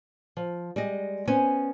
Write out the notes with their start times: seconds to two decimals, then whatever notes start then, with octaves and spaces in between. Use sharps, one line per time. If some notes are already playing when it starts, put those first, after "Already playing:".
0.37 F3
0.76 G3 G#3 D#5
1.28 B3 C#4 C5 G#5